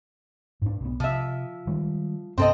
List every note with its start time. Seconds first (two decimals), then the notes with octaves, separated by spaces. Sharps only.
0.62 G#2 D4
0.81 B1 B3
1.00 C3 F3 E5
1.67 D#3 G3 G#3
2.38 G2 C3 B3 C4 A4 D#5